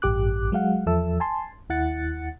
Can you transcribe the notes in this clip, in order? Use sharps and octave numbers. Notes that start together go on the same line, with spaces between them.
A1 G2 G4 D6 F#6
F#3 G#3 F5 F#5
E2 F3 A4 E5 A5 E6
G#5 A5 C6
D#2 E4 F#5 F#6 A6 C#7